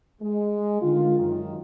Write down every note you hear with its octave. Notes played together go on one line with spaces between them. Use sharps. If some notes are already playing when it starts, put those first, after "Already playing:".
G#3
D3 D#3 F4
F#2 D#3